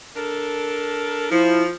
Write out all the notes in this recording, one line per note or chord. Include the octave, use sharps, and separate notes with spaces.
D4 A4 A#4
F3 E4